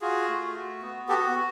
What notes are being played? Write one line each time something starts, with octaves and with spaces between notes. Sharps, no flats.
F4 F#4 G#4
A3
F#4
B3
F#4 G4 A4
B3